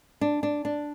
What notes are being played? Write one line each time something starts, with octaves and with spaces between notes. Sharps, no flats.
D4
D4
D4